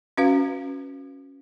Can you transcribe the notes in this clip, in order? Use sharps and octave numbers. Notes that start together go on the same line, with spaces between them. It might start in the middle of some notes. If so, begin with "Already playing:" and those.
C#4 F#4 B4 F5